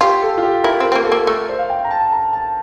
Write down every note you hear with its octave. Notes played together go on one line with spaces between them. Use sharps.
F4 G4
A4
F4
G4
E4 A#4
C4
A#4
C4
A#3
A4
A#3
A3 A#4
C5
F5
G5
A#5
A5
A#5
A5